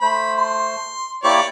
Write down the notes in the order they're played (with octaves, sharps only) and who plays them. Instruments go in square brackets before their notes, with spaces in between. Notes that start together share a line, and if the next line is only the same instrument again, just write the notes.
[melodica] A3 C5 [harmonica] B5
[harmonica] C6
[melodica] A#3 E4 G4 [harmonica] C#5 D5